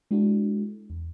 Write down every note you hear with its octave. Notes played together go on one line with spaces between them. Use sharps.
G#3 D4 E4 F#4 A4
E2